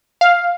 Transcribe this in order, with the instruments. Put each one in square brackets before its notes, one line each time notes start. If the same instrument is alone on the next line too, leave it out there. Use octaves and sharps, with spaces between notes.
[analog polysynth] F5